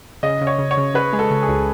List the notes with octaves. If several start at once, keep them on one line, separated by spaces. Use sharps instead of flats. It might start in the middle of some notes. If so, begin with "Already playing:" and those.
C#3 D#5
C#3
C#5
C#3
C#5
C#3
C#3 B4
G#3
A4
C#3
G#4
C#2